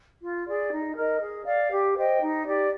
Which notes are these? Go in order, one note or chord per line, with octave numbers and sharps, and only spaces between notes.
F4
G#4 D5
D#4
A#4 D#5
G#4
D5 F5
G4
C5 D#5 G5
D#4
G4 D5